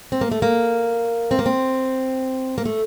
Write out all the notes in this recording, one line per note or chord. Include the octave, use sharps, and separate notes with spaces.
C4
A#3
A3
A#3
C4
A#3
C4
A#3
A3